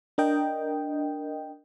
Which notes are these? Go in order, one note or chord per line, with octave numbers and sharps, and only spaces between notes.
D4 A#4 D#5 G5